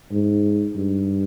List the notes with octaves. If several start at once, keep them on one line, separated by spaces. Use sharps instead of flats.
G#2
G2